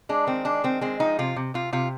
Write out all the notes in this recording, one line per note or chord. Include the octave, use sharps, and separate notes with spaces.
G#3 D4
D#3 C4
G#3 D4
D#3 C4
G#3 C4
F3 D#4
C3 F4
C3
C3 F4
C3 F4